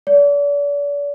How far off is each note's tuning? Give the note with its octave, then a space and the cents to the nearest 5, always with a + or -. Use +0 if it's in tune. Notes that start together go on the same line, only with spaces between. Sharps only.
D5 -40